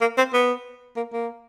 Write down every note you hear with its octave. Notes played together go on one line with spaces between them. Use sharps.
A#3
C4
B3
A#3
A#3